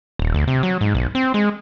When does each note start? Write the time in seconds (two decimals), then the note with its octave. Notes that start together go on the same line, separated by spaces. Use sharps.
0.19 D#1
0.34 D2
0.47 C3
0.63 F#3
0.81 G#2
0.95 B1
1.15 C4
1.34 G#3